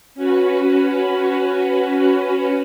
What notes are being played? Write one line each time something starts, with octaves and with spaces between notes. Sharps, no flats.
C#4 F#4 B4